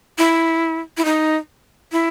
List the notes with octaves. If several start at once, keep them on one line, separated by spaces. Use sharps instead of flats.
E4
E4
D#4
E4